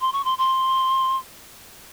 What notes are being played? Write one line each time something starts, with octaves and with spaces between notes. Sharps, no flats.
C6
C#6
C6
C6